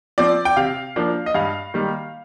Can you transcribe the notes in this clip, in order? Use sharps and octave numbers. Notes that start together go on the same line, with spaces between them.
F3 C4 D5
G5
C3 F5
F3 A#3 D4
D#5
G2 F5
D#3 G3 A#3